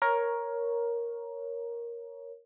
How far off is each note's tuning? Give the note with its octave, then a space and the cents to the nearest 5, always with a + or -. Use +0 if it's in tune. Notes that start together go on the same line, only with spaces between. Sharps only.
A#4 +10 C#5 +0